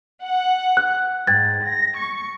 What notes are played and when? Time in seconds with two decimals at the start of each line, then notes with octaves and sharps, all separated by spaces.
0.22 F#5
0.77 F#6
1.27 G#2 G5 G#6 A6
1.63 A#6
1.96 C#6